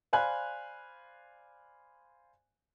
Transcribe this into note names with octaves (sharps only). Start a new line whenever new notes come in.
C5 D5 F5 G#5 B5 F#6